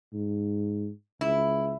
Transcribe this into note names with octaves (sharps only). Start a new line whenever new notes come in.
G#2
C#2 E4